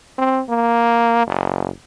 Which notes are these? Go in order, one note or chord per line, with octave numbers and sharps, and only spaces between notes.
C4
A#3
F#1